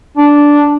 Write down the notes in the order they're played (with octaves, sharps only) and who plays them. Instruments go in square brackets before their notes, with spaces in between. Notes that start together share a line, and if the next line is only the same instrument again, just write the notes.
[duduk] D4